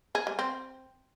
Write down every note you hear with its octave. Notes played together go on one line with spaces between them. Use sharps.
G#4
G3
C4